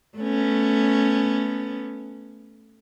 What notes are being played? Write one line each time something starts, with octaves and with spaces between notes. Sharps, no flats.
A3 B3 C#4